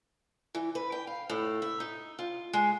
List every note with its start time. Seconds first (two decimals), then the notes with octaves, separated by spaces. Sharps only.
0.55 E3
0.75 B4
0.92 G5
1.07 F5
1.30 A2
1.62 E5
1.80 D#4
2.19 F4
2.53 G#3